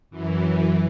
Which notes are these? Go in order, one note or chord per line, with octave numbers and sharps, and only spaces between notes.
F#2 E3